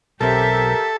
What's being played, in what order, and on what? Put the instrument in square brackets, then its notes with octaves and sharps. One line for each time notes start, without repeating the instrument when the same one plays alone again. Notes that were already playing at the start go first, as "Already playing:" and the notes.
[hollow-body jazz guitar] B1 C4 [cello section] G4 E5 [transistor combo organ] A4 [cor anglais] A#4